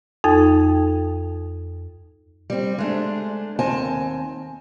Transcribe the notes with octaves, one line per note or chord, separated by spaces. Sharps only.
F2 D#4 A4 G5
G3 C4
G#3 A3 D4
D#2 C4 G#5 A5